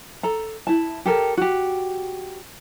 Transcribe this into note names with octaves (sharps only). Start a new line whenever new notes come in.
A4 A#5
E4 A5
G4 A4 A#4
F#4 G4